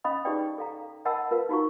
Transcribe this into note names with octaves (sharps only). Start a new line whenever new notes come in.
C#4 D#5 F5 B5 D#6
D#4 G4 G#4 B4 D5 G5
A4 F5 A#5
A#4 D#5 F#5 A5 B5 E6
F4 A#4 B4 F5
D#4 F4 F#4 F5 A#5 C#6